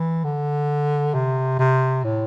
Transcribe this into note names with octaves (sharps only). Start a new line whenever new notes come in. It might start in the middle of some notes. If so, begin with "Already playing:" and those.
Already playing: E3
D3
C3
C3
A2